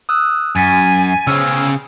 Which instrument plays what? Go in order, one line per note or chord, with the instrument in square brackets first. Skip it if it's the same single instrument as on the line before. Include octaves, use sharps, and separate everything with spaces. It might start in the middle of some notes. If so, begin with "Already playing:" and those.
[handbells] D#6 E6 F#6
[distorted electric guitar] F#2 [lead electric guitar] G#5 [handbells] G#6 A6 B6
[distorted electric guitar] C#3 G#4 [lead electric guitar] C#4 C5 [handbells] E6 F6 G#6